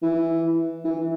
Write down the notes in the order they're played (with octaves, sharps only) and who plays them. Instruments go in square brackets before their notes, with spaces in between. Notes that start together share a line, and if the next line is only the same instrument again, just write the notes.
[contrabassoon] E3
E3